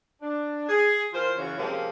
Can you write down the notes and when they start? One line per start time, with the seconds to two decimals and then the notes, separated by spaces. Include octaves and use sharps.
0.22 D4
0.69 G#4
1.13 E3 F4 A#4 C5
1.37 F#2 C#3 E3 C#4 F4 F#4
1.58 C3 F3 G#3 A#3 C4 C#4